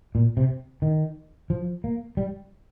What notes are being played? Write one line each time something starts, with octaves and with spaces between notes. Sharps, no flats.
A#2
C3
D#3
F3
A#3
G3